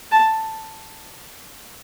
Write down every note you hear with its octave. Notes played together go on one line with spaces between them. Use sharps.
A5